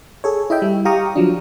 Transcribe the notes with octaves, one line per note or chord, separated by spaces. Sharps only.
G#4 A4 C#5
E4 D#5 E5 G5
G3
G4 F5 G5 A#5 C#6 D#6
F3 F#3 D4